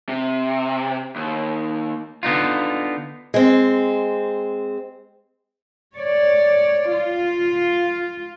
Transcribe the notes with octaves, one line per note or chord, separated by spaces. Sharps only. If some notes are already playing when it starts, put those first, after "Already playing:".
C3
D#2
D3 B3 D#4 F4
G#3 C4
C#5 D5
F4